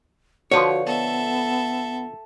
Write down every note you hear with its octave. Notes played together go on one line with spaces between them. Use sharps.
D3 F3 F#4 B4 C#5
B3 A4 E5